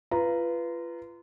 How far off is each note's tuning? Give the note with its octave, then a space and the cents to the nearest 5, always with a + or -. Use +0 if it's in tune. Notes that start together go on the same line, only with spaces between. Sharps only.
F4 -25 B4 +0 A#5 +0